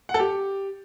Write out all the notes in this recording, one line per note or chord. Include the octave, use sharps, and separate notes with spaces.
F#5
A4
G4